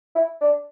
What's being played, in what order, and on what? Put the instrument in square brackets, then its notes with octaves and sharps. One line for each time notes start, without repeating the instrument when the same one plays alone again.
[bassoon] E4
D4